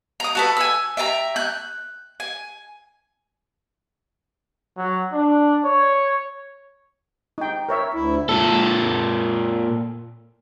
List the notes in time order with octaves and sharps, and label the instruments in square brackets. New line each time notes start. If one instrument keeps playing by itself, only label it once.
[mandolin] A#5 D#6
F#4 A4 B4
G#5 E6
E5 G5 A5 A#5
F#6 G6
G#5
[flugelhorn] F#3
D4
C#5
[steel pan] D#4 G5
A#4 C#5 E5
[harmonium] D2 E4
[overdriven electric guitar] A#2 A4